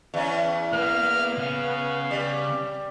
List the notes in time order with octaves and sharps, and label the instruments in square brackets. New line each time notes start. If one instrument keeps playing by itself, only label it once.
[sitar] E2 C#4
[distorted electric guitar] A#3 [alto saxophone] B3 [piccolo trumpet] F6
[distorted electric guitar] C#3 C#4 [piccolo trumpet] F5
[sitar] G3